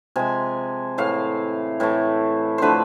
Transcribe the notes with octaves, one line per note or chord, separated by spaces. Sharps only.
C3 F3 G#3 G#5
A2 E3 A3 F5
A2 E3 A3
D3 F3 A3 B4 C5